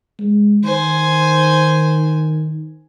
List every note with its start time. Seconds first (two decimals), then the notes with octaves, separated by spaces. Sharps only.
0.19 G#3
0.64 D#3 C5 G#5